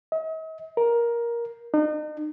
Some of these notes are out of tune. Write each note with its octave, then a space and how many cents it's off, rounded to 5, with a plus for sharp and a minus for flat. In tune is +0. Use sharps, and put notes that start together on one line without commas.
D#5 +45
A#4 +15
D#4 -40